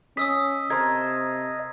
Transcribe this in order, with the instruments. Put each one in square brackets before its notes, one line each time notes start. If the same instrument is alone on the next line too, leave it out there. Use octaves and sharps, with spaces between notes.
[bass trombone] C#4 [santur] D#5 [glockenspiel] D#6 E6 B6
[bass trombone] C3 [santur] A#4 C5 A5 [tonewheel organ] D#5 [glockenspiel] G#6